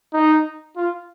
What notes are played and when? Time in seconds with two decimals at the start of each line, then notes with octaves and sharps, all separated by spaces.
0.13 D#4
0.77 F4